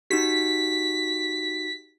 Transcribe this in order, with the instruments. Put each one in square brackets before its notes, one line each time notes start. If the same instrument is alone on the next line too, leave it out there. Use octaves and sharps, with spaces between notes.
[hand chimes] D#4 F#4 G4 [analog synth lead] B6